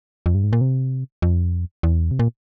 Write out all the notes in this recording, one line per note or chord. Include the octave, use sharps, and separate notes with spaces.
F2
G2
G#2
A#2
C3
F2
E2
C3
A#2